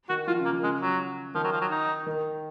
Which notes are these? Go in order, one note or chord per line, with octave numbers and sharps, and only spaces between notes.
D#3 F#4
F3 F4
C#3
A#3
D#3
C#3 G#3
F#3
D#3 F3
F#3
F3
F#3
D#4
D#3